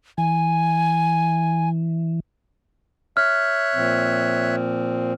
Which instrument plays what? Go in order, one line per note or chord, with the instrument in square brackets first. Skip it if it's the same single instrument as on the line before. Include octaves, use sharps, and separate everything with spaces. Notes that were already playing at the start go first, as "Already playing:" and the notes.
[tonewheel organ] E3 [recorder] G#5
[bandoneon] C#5 E5 F#6 [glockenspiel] F6
[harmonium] A#2 F3 C4